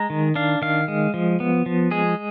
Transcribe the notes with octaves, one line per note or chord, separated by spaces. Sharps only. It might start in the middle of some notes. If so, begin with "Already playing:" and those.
Already playing: G#3 A#5
D#3
D4 F5
D#3 F5
G#3
F3
B3
F3
G#3 G#4